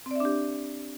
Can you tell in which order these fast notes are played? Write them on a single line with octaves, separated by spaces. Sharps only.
C4 D5 E5 D4 G4